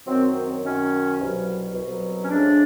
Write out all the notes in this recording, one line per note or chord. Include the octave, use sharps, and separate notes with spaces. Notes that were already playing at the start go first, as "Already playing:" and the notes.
F#2 D#3 F#3 C4
F#2 D#3 F#3 C#4
C2 B2 F#3
C2 B2 F#3
C#4
A2 F3 G#3 D4